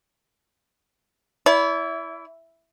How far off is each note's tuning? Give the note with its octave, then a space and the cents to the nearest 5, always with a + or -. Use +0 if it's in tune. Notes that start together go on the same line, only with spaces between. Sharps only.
E4 +0 D5 -45